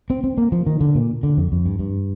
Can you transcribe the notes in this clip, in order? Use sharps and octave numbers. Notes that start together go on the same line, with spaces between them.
C4
C4
A#3
F3
D#3
D3
A#2
D3
F2
F2
G2
G2